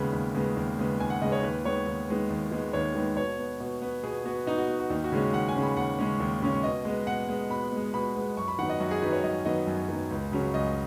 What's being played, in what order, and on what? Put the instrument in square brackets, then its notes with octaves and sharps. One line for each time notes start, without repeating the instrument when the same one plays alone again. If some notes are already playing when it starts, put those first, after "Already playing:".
Already playing: [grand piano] D#2 C#3 G#3 B3 B5
D#2
C#3 G#3 B3
D#2
C#3 G#3 B3
D#2 G#5
F#5
C#3 G#3 B3 D#5
C#5
D#2 B4
D#3 G#3 B3 C#5
D#2
D#3 G#3 B3
D#2
D#3 G#3 B3
D#2 C#5
D#3 G#3 B3
B2 C#5
B3
B2
B3
B2 G#4
B3 F#4
B2 D#4
F#4
B3
F#4
D#2 D#4
F#4
C#3 G#3 C#4
D#2 F#5
G#5
C#3 G#3 C#4
B5
D#2 F#5
C#3 G#3 C#4
D#2
C#3 G#3 C#4
B2 D#5
G#3 B3
B2 F#5
G#3 B3
B2 B5
G#3 B3
B2 B5
G#3 B3
F#2 C#6
B5
D#3 F#3 B3 F#5
D#5
F#2 F#4
G#4
D#3 F#3 B3 B4
C#5
F#2 D#5
D#3 F#3 B3 D#5
F#2
D#3 F#3 B3
C#2
C#3 F#3 C#4
C#2 D#5